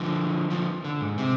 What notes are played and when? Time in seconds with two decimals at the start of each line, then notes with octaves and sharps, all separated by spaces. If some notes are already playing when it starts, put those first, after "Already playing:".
Already playing: D3 F3
0.50 D3 F3
0.84 D3
1.01 G#2
1.18 C3